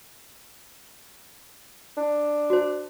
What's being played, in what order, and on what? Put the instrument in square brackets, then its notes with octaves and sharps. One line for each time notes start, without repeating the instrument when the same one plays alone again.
[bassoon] D4
[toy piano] F#4 C5